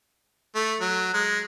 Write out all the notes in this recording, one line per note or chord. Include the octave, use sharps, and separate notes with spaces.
A3
F#3
G#3